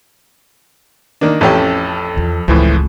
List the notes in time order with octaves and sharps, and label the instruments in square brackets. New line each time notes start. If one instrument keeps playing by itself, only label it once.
[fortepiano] D#3 A#3 D4
[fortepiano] A1 C#4 G4 [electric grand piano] F2 A4
[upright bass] E2 F3
[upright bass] F1 C#2 [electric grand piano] A2 E3 F3